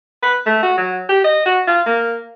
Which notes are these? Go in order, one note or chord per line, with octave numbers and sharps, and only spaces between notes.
B4
A3
F#4
F#3
G4
D#5
F#4
F4
A#3